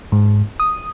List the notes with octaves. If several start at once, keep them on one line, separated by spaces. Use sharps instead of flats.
G#2
D#6